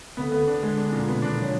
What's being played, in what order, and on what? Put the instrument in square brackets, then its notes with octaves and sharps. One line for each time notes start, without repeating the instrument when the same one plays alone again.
[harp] D3 [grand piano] B3
[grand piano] B3
D4
G#3
D4
A#2
[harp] B2 [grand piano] B3
[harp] D#3 [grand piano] D4
[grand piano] A#2 [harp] F#3